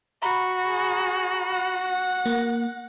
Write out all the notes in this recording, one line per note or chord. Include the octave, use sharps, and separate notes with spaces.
F#4 A#5 B5
G#4
F#5
A#3